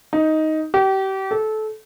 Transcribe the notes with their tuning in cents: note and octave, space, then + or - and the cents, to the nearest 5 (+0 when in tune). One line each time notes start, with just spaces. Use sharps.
D#4 +10
G4 -30
A4 -20